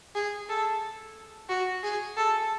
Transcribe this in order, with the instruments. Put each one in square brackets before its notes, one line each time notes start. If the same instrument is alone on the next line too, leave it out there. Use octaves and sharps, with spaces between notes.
[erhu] G#4
A4
F#4
G#4
A4